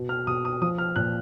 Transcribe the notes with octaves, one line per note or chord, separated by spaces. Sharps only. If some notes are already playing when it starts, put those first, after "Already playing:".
Already playing: B2
F6
B2 D#6
D#6
F3 D#6
F6
A#2 F#6